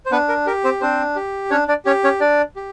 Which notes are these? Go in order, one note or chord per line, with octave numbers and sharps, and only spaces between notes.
C5
B3 D4 B4
A#4
G4 A#4
C4 C5
C4 D4 C5
G4
C#4 D4 C#5
D4 D5
C#4 G4 C#5
C#4 C#5
D4 D5
G4